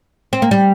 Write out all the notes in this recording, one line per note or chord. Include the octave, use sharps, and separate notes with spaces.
C4
A#3
G3